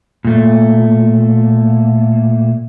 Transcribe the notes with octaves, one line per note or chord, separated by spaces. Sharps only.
A#2 A3